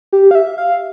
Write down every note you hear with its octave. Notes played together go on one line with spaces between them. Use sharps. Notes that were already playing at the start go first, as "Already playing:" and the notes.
G4
F5
E5
F5